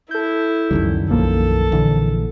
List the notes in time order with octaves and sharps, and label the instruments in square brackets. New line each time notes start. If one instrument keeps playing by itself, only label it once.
[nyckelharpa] E4 [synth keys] A4 G6
[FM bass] C#2 [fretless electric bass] F#2 D#3 G3
[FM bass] B1 [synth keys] F3 A#3 [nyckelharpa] A4
[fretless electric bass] A#1 [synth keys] D3 [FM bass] E3